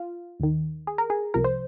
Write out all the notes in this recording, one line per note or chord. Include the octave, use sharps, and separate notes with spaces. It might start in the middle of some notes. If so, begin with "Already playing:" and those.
Already playing: F4
D#2 D#3
G#4
A#4
G#4
C2 C3 F3 A#4
C5